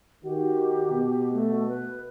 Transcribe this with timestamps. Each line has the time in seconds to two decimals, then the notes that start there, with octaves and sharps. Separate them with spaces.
0.25 D#3 F#4 G4
0.90 B2
1.33 A3
1.68 B4